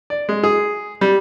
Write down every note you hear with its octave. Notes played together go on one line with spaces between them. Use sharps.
D5
G#3
G#4
G3